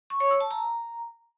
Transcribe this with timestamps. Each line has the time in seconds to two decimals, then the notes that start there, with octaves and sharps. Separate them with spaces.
0.10 C#6
0.20 C#5
0.30 E6
0.41 A5
0.51 A#5